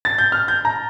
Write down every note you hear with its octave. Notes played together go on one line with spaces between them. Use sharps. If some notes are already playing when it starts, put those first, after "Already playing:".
A6
G6
F6
G6
A#5